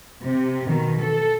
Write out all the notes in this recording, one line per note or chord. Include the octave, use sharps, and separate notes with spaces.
C3
B2 D#3
A4